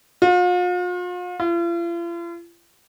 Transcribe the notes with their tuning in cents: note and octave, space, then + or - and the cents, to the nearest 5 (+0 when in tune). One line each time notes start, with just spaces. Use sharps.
F4 +40
F4 -45